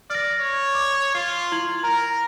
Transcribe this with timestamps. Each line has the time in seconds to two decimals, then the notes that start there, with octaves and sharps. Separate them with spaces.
0.10 D5 F6 A#6
0.40 C#5
0.75 D6
1.15 F4 C7
1.52 E4 G#6 F#7
1.83 A#4 A#5